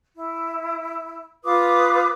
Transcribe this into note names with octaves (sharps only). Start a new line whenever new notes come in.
E4
F4 B4 D6 D#6